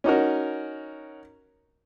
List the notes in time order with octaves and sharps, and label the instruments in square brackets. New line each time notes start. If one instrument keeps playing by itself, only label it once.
[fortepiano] C#4 D#4 F#4 A#4